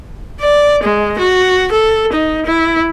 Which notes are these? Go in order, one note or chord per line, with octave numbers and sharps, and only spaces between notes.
D5
G#3
F#4
A4
D#4
E4